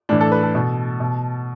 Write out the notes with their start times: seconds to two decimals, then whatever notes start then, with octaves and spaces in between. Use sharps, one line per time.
0.09 A2 E3 D4
0.21 A4
0.32 B4
0.43 A4
0.55 B2
1.00 B2